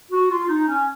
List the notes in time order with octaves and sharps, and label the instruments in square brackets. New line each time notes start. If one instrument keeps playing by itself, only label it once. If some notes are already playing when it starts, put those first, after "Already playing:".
[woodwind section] F#4
F4
F4
D#4
C#4